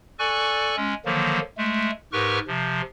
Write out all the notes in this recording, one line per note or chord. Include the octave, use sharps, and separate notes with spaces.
A4 D5 G#5 C#6 F#6
G#3 C#4
D3 D#3 F3 F#3 A#3
G#3 A3
G#2 G4 A#4 B4 C#6 F6
C3 F3